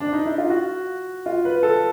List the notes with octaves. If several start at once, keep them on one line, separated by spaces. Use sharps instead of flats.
D4
D#4
E4
F4
F#4
F4
B4
A4